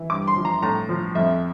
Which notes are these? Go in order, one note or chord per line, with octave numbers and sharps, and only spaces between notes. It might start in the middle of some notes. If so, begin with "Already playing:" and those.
Already playing: E3
G2 D6
C6
F3
A#5
A2 A#5
F3
F2 E5